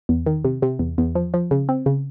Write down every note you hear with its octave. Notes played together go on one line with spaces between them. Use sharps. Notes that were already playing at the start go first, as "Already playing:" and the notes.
E2
D#3
C3
C3
E2
E2
F3
F3
C#3
C4
C#3